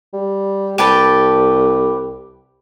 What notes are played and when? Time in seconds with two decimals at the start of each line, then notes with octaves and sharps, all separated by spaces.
0.13 G3
0.78 C2 G4 B4 A5